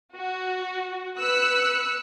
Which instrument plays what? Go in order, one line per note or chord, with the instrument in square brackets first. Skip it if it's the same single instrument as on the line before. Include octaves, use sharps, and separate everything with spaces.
[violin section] F#4
B4 E6 F#6 C#7